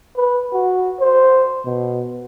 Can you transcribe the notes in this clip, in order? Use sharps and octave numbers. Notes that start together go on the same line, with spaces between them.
B4
F#4
C5
B2